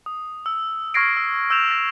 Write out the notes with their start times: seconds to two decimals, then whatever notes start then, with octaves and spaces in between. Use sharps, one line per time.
0.06 D#6
0.46 E6
0.94 C#6 F6 G#6 A#6 C7 D7
1.17 E6
1.50 E6 G6 E7 F7
1.71 A#6